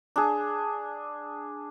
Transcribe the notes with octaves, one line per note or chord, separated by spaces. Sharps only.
D4 G#4